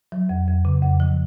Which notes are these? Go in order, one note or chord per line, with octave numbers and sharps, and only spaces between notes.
F#3
F2
F2
C#3
F2
F3